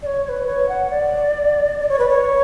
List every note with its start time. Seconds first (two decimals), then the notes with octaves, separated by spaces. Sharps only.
0.02 D5
0.06 C#5
0.24 C#5
0.29 B4
0.47 C#5
0.69 F#5
0.90 D5
1.80 D5
1.89 C#5
1.99 B4
2.09 C#5